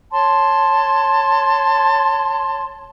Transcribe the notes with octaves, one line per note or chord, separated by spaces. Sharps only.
C#5 A5 C6